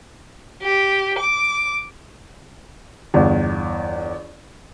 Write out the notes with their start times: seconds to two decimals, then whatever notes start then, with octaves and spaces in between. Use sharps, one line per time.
0.62 G4
1.19 D6
3.14 G1 E2